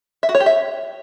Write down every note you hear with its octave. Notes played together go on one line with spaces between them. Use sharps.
E5
F#4
C#5
G4
E5